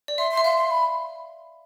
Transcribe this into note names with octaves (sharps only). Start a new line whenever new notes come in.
D5
E5 C6
C6
E5
F5 C6
C6
B5